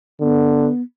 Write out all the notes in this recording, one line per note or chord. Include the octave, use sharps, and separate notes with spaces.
D3 B3